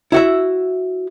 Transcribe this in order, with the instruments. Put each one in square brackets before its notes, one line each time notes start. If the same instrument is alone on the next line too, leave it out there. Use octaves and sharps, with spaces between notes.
[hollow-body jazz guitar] E4 F#4 E5